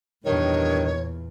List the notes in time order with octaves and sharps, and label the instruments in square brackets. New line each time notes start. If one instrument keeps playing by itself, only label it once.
[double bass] E2 A#2 [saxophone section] G2 D#3 [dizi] C#5